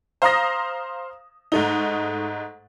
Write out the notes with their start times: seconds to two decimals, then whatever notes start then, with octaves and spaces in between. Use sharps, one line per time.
0.22 C5 F5 A#5 D#6 A#6
1.52 G#2 A3 D#4